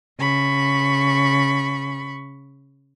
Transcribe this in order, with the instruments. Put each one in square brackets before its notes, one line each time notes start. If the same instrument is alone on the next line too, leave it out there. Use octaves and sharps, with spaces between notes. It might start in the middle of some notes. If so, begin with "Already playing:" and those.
[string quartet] C#3 B5 C#6